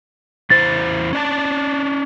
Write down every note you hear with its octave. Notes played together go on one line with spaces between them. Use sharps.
E2 E4 C5 A6
C#4 D5 A5